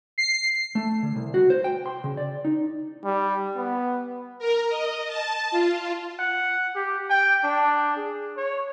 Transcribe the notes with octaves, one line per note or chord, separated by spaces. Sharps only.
C7
A3
D3
C2
F#4
C5
G5
C6
C#3
D5
D#4
G3
B3
A#4
D#5
A5
F4
F#5
G4
G5
D4
G#4
C#5